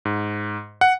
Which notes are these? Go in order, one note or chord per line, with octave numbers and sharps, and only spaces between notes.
G#2
F#5